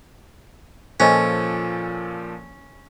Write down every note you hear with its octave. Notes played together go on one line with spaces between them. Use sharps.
A#2 F3 C#4 A4 C5 D#5 G#5